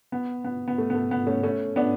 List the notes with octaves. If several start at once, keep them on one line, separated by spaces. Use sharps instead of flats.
B3
B3
B3
A3
B3
A3
B3
A3 C#4
A3 C#4
B3 D4